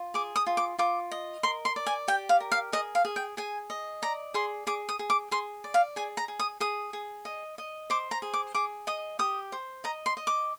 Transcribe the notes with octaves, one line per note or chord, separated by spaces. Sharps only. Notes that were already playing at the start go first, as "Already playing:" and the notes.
Already playing: F4
G#4 D6
D#6
F4
D6
F4 D6
D#5
A#4 C6
C6
D5
G#5
G4 G5
F5
A#4
F5
G#4 D#5
F5
G#4
G5
G#4 G#5
D#5
D5 A#5
G#4 C6
G#4 D6
D#6
G#4
D6
G#4 C6
D5
F5
G#4 G#5
A#5
G#4
D#6
G#4 D#6
G#4
D#5
D#5
C5 D6
A#5
G#4
D6
G#4 D6
D#5 D#6
G4 D#6
C5
D#5 A#5
C6
D#5
D6